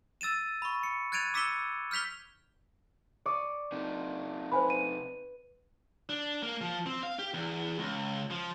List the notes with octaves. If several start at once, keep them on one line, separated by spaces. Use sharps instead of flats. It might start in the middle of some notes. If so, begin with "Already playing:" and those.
E6 A6 D#7 E7
B5 C#6
C#7
F#6 G#6 A6 D7 D#7 F7
D6 E6 B6 C#7 E7 G7
F6 G6 B6 F7 G7
D5 C#6 D#6
C3 D#4
B4 C5 G#5 B5
D#7
D4
A#3
F3
C4
F5
G4
E2
C#2
F3